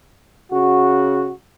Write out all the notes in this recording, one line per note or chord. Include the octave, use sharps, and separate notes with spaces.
C#3 F#4